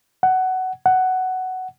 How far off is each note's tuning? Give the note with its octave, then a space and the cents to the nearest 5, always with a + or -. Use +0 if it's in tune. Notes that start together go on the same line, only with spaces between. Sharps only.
F#5 +15
F#5 +10